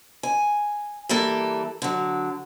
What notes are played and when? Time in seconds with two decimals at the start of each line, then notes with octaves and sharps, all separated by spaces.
0.23 G#5
1.09 E3 G3 A#3 A4
1.82 D3 F#3